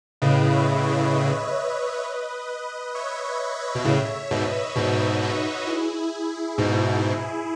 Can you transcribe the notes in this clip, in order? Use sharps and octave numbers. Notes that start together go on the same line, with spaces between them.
A2 C#3 B4 D#5
C#5 E5
C#5 E5
B4 D#5
C#5 E5
B4 D#5
B4 D#5
B2
A2 C#3 C#5 E5
G#2 B2 B4 D#5
G#2 B2 B4 D#5
D#4 F#4
E4 G#4
G#2 B2